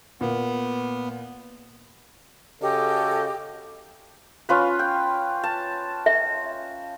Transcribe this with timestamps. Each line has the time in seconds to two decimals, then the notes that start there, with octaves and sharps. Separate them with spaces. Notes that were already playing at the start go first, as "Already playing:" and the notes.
0.21 A#2 B3
2.61 C#3 F#4 G4 A4 D#5
4.49 C#4 F4 B4
4.79 G5
5.44 A5
6.06 E5